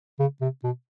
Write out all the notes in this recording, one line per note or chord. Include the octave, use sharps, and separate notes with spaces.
C#3
C3
B2